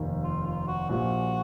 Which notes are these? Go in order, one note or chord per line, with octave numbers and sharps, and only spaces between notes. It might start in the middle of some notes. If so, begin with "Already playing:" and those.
Already playing: F1 D#2 D#3
F4
F4
F#4
A#1 A#2 G3 F#4